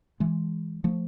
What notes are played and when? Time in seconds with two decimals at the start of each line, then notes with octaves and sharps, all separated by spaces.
0.20 E3 G#3
0.84 F3 A3